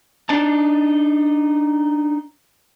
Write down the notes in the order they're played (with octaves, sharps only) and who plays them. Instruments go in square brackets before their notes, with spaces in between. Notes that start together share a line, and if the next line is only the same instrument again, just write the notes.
[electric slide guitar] D4 D#4 A5